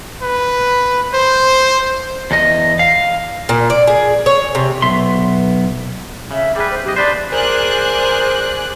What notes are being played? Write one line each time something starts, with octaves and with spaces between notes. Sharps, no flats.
B4
C5
E2 D#5
F5
A#2
D5
G#4
C#5
C3
B1 B3 E5 C6
C#3 E5
G3 G#4 B4
C5
B1 G4 D#5
D4 B4 C5 D5
G#4 A#4 C5 D5 F#6